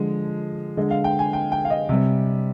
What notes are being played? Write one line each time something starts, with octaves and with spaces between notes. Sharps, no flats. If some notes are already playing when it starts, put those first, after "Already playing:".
Already playing: D3 F3 G#3
D3 G#3 D#5
F5
G5
G#5
G5
G5
F5
D#5
C3 G3